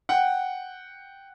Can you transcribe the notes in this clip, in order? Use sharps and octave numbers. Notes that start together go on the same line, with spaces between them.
F#5 G5